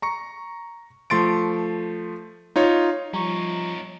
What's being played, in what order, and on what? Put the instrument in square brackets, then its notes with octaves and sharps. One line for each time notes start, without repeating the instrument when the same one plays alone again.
[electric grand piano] A#5 C#6 C#7
F3 A3 C6 A6 D7
D#4 F4 C#5
[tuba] F3 [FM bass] G3 [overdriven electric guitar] C#4 D#4 [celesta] A#5 C#6